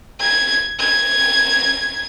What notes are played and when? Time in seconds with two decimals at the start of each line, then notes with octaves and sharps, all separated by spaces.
0.21 G#6
0.80 G#6